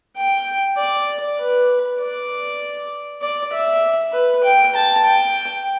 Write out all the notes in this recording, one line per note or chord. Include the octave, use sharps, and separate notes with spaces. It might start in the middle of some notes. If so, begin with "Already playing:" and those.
G5
D5
B4
D5
D5
E5
B4
G5
A5
G5